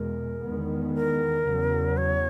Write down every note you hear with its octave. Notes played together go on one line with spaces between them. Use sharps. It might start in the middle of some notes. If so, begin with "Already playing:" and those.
Already playing: E2 B2 G#3 A#4
E2 D#3 G#3 B3
A#4
E2 C#3 F#3
C#5